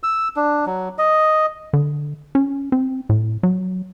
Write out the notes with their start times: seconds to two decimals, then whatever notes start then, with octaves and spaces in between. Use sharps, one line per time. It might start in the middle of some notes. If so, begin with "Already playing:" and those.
0.03 E6
0.36 D4
0.66 F#3
0.98 D#5
1.73 D3
2.35 C#4
2.72 C4
3.09 A2
3.43 F#3